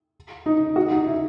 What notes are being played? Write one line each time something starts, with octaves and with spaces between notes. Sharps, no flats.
D#4
F#4
D#4
E4